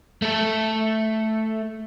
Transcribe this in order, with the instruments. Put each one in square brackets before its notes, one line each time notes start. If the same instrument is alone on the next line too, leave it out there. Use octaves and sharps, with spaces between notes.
[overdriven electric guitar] A3 A4